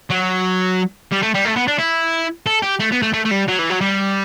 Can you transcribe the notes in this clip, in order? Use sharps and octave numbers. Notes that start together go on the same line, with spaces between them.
F#3
G3
A3
G3
A3
B3
D4
E4
A4
G4
A3
B3
A3
A3
A3
G3
F#3
E3
F#3
G3